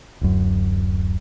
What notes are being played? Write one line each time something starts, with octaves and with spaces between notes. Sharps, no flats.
D1 F#2